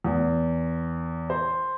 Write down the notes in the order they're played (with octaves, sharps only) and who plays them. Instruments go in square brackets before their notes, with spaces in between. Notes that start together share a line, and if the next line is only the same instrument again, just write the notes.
[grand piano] E2
C5